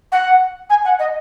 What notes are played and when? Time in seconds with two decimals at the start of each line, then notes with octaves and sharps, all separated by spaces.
0.12 F#5
0.70 G#5
0.85 F#5
0.99 D#5